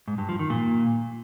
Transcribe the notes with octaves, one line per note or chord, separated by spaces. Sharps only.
G#2
G2
F3
D#3
A#2